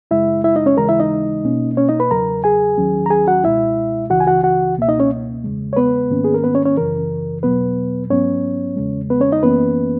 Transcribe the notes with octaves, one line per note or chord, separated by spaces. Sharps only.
F#2 C#3 G#3 E4 E5
E4 E5
D#4 D#5
C#4 C#5
D#2 C#3 E3 G#3 A#4 A#5
E4 E5
D#4 D#5
B2 A#3 C#4
C#4 C#5
D#4 D#5
B4 B5
E2 C#3 F#3 A#4 A#5
G#4 G#5
D#2 D#3 F#3 C#4
A#5
G#4 G#5
F#4 F#5
C#2 B2 G#3 E4 E5
C#2 C#3 E3 F#4 F#5
G#5
F#4 F#5
F#4 F#5
C#2 B2 A#3 E5
D#4 D#5
C#4 C#5
E2 C#3 G#3
C#5
B3 B4
G#2 D#3 A#3 C#4
G#4
A#4
B3 B4
C#4 C#5
C#4 C#5
F#2 C#3 E3 A#4
E2 B2 F#3 B3 B4
G#2 F#3 B3 C#4 C#5
E2 C#3 G#3
B3 B4
C#4 C#5
D#4 D#5
F#2 E3 A#3 B3 C#4 B4